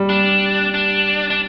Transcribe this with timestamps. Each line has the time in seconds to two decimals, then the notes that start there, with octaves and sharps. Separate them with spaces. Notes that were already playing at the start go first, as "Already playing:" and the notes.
Already playing: G3
0.09 D4
0.74 D4
1.30 D4